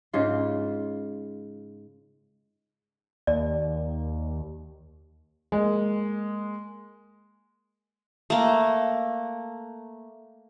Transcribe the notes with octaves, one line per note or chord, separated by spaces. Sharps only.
G#2 C#3 F4
D#2 D5
G#3 A#3
A3 A#3